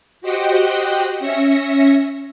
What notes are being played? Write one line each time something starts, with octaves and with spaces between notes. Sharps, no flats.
F#4 G4 C5 D#5 F#5 G5
C#4 E5 A#6 C#7